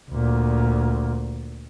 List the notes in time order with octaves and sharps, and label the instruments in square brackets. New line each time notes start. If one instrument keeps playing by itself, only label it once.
[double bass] D2 A#2